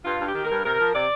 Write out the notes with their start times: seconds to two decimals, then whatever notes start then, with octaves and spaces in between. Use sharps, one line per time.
0.05 G2 F4
0.20 G2 G4
0.35 D#3
0.45 A#4
0.51 G2
0.65 C3 A#4
0.80 F3
0.94 C3 D5